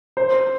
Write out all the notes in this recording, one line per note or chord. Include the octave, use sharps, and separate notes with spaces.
C5